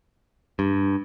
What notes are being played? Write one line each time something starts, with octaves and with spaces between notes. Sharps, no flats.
G2